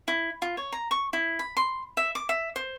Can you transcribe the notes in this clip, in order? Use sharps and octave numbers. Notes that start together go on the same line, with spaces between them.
E4
F4
C#5
A#5
C#6
E4
B5
C6
E5
D6
E5
C5